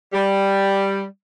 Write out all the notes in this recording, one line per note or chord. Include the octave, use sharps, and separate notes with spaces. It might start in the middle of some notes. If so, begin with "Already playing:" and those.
G3